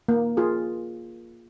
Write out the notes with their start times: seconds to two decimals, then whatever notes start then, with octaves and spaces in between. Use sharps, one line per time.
0.08 A#3
0.37 F4 G#4